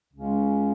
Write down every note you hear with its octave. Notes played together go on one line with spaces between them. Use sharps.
C#2 C#3 G#3 C#4